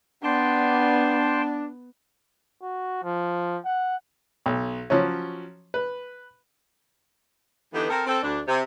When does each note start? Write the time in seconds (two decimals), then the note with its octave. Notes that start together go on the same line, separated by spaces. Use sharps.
0.24 B3 D4 G5 A5 C6
2.63 F#4
3.04 F3
3.65 F#5
4.46 B1
4.90 F3 F#3 C#4
5.74 B4
7.73 D3 E3 B3 D#4 G4
7.90 C4 A4 A#4
8.07 C4 A4
8.23 D2 D4
8.48 C3